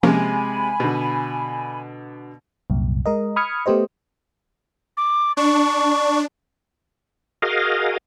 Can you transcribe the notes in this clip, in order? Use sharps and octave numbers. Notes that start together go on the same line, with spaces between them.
C3 F3 G#3 A#3 C#4 G#5 B5
B2 D3
C2 F#2 A#2
G#3 A#4 D#5
B5 D#6 F6 G#6 C#7
A3 B3 G4 C5 D#5
D6
D4 C#6
F#4 G#4 A#4 D#5 F5